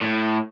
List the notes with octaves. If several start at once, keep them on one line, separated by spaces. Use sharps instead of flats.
A2